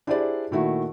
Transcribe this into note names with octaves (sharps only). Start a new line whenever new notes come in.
D4 E4 G4 G#4 C5 D5
A#2 D#3 A3 E4 F#4